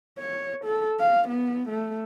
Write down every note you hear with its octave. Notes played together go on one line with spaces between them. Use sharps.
C#5
A4
F5
B3
A3